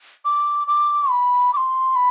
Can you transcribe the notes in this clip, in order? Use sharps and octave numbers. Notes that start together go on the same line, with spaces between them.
D6
D6
B5
D6
C6
B5